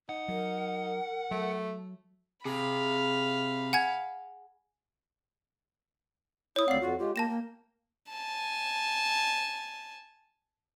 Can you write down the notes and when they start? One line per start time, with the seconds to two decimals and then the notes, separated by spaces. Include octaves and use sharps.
0.09 D#4 F#5
0.28 F#3 A#4
1.31 F#3 A3
2.45 C3 G#4 F5 B5
3.73 F#5 G#5 G#6
6.56 E4 C#5 D#6
6.68 D2 C4 D5 F5 F#5 C7
6.82 F2 F4 F#4
6.99 G#3 F4 G4
7.16 A#3 G5 A5 A#6 E7
7.29 A#3
8.11 G#5 A5